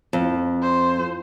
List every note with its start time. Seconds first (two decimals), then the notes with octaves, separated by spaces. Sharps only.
0.13 F2
0.63 C5